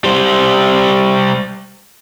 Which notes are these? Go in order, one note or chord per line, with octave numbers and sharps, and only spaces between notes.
G3 C5